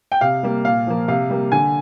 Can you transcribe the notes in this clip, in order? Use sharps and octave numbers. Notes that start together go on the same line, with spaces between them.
G5
C3 F5
G3 A#3
A#2 F5
F3 A#3
C3 F5
G3 A#3
D3 G#5